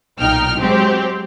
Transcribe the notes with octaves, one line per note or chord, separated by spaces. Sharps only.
B1 A#2 D#4 G5 F6
F#3 G#3 C4 G4